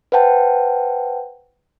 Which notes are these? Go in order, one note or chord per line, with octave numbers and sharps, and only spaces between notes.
B4 C5 F#5 G5 A5